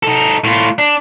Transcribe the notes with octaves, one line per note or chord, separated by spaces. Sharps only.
D#4 A4
A2 F4
D4